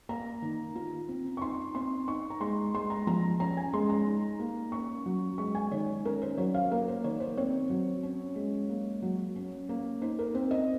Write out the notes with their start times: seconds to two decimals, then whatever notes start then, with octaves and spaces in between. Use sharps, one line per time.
0.09 A#3 A#5
0.42 D#3
0.76 F4
1.08 C4
1.37 C#6
1.42 D#4 C6
1.75 C4 C6
2.08 D#4 C#6
2.30 A#5
2.40 G#3 C6
2.74 G#3 C6
2.90 A#5
3.07 F3 A#5
3.40 C#4 A#5
3.57 G#5
3.73 G#3 C6
3.90 A#5
4.06 D#4
4.39 A#3
4.72 C#4 C#6
5.06 F#3
5.38 G#3 C#6
5.55 G#5
5.72 D#3 C#5
6.05 C#4 A#4
6.22 C5
6.38 F#3 C#5
6.54 F5
6.71 A#3 A#4
6.88 C5
7.04 D#3 C#5
7.20 C5
7.37 C4 C#5
7.70 F#3
8.03 C#4
8.36 G#3
8.69 A#3
9.02 F#3
9.36 C#4
9.69 A#3
10.02 D#4 C5
10.19 A#4
10.35 C4 C5
10.51 D#5